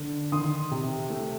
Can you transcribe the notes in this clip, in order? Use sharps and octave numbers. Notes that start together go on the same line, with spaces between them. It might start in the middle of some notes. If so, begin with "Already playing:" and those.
Already playing: D3
D#3 C6 D#6
C3
A3